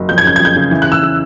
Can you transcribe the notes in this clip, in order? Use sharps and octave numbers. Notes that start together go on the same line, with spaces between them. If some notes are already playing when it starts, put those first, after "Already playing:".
Already playing: F#1
F2 G6
G#6
C#3 G6
F2 G#6
G6
C#3
E3
E2 F#6
E6
C#3